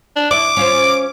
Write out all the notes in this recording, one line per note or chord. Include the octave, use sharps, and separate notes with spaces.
D4
E4 D5 D6
C#4 F4 C5